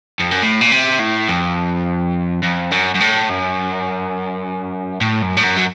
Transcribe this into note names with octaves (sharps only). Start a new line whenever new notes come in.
F2
F#2
A2
A#2
C3
A2
F2
F2
F#2
F#2
A2
F#2
A2
F#2
A2
F#2
F#3